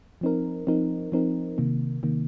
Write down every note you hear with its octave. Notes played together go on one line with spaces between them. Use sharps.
F3 C4 D#4 A#4
F3 C4 D#4 A#4
F3 C4 D#4 A#4
C3 D#3 A#3
C3 D#3 A#3